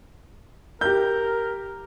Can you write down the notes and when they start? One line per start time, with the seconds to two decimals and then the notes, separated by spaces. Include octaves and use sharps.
0.81 G4 A#4 G6